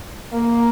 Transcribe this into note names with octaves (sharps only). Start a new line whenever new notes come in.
A#3